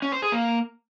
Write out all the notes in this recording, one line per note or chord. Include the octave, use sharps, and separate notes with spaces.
C#4
C5
G#4
A#3